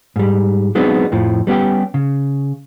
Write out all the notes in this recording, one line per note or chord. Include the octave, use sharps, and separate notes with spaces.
G#2 G3
F#3 G#3 B3 C4 D4 D#4
F2 A2 F3
G3 B3 C#4 G4
C#3